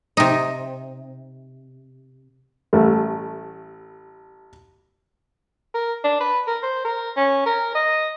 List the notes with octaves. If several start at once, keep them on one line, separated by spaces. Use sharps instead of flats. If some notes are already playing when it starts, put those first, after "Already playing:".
C3 D#4
A1 G3 A3
A#4
D4
B4
A#4
C5
A#4
C#4
A#4
D#5